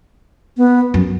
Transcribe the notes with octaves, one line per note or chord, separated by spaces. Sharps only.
B3
F#2